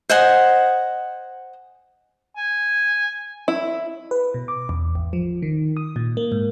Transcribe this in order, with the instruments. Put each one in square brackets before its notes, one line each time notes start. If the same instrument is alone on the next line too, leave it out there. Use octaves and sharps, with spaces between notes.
[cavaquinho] C5 D#5 F#5 G#5
[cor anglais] G#5
[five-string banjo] E4
[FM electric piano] B4
B2
D6
E2
G#1
F3
D#3
D#6
A#2
A#3
G#2